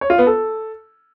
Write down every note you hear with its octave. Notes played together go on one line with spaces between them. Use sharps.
C#5
F4
B3
A4